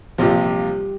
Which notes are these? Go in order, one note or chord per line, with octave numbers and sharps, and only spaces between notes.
A#1 C3 F3 G3 G4